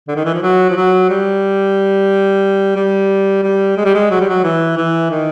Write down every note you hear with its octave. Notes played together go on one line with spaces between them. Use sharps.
D3
D#3
E3
F3
F#3
F3
F#3
G3
G3
G3
G#3
G3
G#3
F#3
G3
F#3
E3
E3
D#3